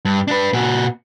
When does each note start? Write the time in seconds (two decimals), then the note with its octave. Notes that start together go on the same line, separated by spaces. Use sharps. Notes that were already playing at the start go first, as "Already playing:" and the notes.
0.05 G2
0.28 D4 B4
0.53 A#2 F#4